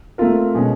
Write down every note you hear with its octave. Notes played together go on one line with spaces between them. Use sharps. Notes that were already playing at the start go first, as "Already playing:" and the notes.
A3 C4 F4 A#4
B2 G#3 C#4